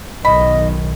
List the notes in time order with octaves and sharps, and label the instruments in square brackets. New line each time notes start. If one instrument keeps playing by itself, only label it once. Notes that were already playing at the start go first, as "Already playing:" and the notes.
[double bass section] B1 D#3 [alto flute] D#5 [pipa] B5